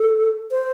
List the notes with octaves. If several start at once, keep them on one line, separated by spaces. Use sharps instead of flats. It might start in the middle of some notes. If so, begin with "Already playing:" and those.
Already playing: A4
C5